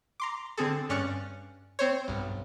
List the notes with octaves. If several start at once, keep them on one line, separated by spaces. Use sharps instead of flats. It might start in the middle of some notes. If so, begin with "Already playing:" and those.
A#5 C6 D6
D3 C4 G#4 A4
G2 C#4 D5 C#6 F#6 A6
C4 C5 C#5
B1 G2